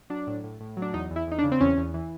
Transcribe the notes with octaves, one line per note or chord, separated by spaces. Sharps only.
F#3 D4
A2
A2
A2
F#3
D4
E2 D#4
E2
E4
E2 D#4
D4
C#3
C4
E2 C#4
E2
E3